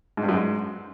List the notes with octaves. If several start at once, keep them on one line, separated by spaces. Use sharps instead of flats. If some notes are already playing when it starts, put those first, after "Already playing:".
G#2
G2
F#2
G#2